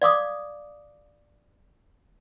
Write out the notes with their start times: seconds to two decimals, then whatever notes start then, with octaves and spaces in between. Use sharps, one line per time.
0.02 D5 F5 D6 D#6